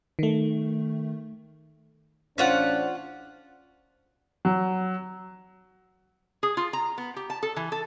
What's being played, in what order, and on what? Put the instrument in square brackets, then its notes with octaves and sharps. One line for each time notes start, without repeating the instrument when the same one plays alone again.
[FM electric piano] D#3 A3
[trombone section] A1 D4 C5 [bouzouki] C#4 F4 F#5
[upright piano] F#3
[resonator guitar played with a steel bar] G#4
F4
A#5
B3
G4
A5
A4
E3
A4